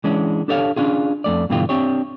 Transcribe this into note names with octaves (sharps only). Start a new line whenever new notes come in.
E3 G#3 C#4 D4
D4 G4 A4 C#5 E5 F5
C#4 D4 F4 G#4
F2 A3 D5
G2 B2 D3 E3 F4 G4
C4 D4 G4 C#5